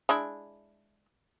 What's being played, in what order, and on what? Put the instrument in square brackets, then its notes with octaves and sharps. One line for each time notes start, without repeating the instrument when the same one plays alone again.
[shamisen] G#3 D4 E4